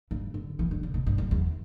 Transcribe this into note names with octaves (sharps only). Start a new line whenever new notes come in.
G2
D3
E3
D3
C#3
B2
G2
F#2
E2